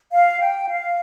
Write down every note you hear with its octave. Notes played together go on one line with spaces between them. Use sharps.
F5
G5
F5